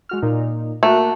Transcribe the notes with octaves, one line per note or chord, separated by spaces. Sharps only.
G#3 F#4 F6
A#2 D#4
A3 A#3 F#4